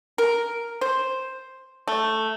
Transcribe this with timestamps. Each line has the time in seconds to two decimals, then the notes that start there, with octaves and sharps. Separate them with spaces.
0.18 A#4
0.81 C5
1.88 A3